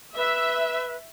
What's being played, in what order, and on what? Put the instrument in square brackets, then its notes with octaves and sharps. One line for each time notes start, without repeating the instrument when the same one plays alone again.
[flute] B4 [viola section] E5